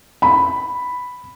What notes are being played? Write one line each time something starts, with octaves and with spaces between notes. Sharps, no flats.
B5